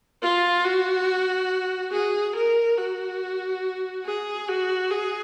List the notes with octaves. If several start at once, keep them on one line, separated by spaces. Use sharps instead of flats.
F4
F#4
G#4
A#4
F#4
G#4
F#4
G#4